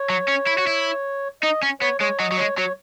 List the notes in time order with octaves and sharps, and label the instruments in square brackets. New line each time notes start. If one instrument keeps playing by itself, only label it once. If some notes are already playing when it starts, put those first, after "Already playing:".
Already playing: [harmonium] C#5
[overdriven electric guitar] F#3
C#4
E4
F#4
E4
[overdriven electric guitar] D#4 [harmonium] D#5
[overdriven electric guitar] C#4
[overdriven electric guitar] B3 [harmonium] C#5
[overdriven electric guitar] G#3 [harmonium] C#5
[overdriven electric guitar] F#3 [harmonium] D#5
[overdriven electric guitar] F#3
[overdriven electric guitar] G#3 [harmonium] C#5
[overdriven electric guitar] F#3 [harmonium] C#5